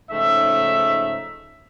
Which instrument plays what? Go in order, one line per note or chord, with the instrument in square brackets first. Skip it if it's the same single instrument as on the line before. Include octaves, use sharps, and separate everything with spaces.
[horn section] G#2 C#3 F3 A3 D#4 E5